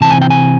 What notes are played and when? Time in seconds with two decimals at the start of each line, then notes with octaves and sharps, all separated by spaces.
0.01 C3 E3 C4 A5
0.10 G#5
0.22 G5
0.30 G#5